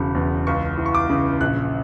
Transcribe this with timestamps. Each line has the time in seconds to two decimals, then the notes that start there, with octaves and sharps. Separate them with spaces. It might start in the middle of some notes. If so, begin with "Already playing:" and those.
Already playing: E1 C#3 B5
0.15 E2
0.47 C#2 C#6
0.78 E3
0.86 C#6
0.95 D6
1.09 C#3
1.41 A#1 F#6